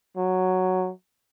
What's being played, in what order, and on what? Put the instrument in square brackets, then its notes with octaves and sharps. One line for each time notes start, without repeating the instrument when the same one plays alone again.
[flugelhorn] F#3